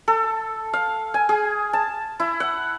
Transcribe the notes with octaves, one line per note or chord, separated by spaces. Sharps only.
A4
F5
G#5
G#4
A5
E4
F#5